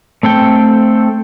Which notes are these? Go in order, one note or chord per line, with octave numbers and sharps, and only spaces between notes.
A3 C4 A4 G5